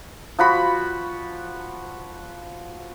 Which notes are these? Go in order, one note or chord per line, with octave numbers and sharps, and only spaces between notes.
F3 F#4 B5